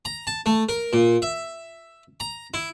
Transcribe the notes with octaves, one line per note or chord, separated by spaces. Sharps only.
A#5
A5
A3
A#4
A#2
E5
A#5
E4